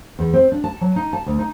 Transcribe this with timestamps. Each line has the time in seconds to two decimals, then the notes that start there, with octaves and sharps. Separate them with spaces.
0.19 E2
0.33 C4
0.52 D4
0.64 A5
0.81 F#3
0.96 D#4
1.13 A5
1.26 D2
1.39 D#4